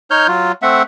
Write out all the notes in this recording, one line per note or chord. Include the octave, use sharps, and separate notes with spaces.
D#4 C#5 F6 G6
F#3 F4
A3 C4 E5 F#5